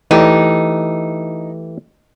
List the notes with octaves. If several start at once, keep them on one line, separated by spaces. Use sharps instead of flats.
E3 A3 D#4 G4